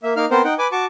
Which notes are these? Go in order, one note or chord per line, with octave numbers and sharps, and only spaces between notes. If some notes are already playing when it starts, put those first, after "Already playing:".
A#3 E5
A#3 D#4 A#4 F5 F6
B3 C4 A#4 C5
D#4 F#5 G5
B4 G#5 D6
F#4 A5 C#6 D6